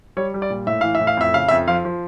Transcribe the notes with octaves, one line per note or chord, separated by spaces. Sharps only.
G3 C#5
G3
D5
A#2
A2 E5
E3 F5
E5
A2
F5
F2 E5
C#3 F5
F2 E5
F3 F5
F3